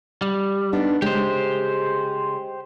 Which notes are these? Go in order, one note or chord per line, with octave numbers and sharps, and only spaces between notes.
G3
B3 D4 D#4
C#3 G#3 G4 G#4 C5